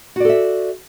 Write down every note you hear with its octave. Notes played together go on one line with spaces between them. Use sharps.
F#4 A4 D5 E5